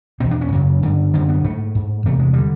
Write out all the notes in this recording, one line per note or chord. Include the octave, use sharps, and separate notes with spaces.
E2 B2 C4
D4
C#4
F#2 C#3
G2 D3
F#2 D3 C4
B3
G#2 A3
G#2
E2 C3 A3
G#3
D3 G3